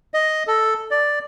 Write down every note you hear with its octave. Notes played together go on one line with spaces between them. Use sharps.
D#5
A4
D5